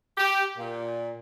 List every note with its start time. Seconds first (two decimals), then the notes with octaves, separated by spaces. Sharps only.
0.17 G4
0.57 A#2